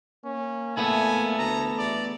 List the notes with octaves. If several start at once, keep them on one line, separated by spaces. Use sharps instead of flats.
A#3 C#4
A3 B3 E4 A4 G#5
D2 A#5
E2 D5